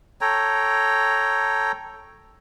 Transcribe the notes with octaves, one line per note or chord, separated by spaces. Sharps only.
A4 C#5 G5 A#5